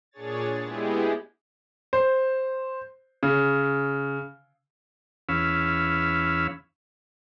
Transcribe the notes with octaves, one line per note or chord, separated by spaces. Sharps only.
A#2 D4 G#4 C#5 A6
G#3 B3 E4 G4 G#4
C5
C#3
E2 C#4 F5 B5 E6